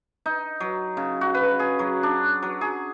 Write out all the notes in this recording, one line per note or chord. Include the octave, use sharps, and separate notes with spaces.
D#4
F#3
C#3
F#4
B4
G#4
F#3
D4
F#3
G#4